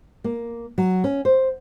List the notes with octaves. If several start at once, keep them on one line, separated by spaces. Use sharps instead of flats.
A#3
F#3
C#4
C5